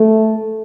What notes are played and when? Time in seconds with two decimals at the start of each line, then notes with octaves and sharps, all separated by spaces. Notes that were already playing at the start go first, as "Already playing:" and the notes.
Already playing: A3